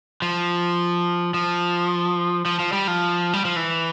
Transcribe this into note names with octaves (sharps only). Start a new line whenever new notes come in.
F3
F3
F3
F3
G3
F3
G3
F3
E3